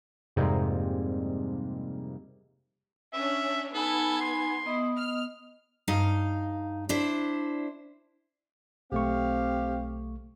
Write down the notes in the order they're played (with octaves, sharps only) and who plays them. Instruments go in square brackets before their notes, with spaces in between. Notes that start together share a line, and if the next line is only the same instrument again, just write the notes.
[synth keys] F2 G#2 C3 G3 G#3 A#3
[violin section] C#4 D4 [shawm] E5
[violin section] B3 G#6 [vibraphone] D#4 G#5 B5 [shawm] A4
[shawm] C6
[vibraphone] B3 D#5 D#6 [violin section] E4
[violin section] F6
[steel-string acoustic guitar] G2 D#4 F5
D4 E4 C5
[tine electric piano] B1 A3 C#6 [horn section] C4 G4 F5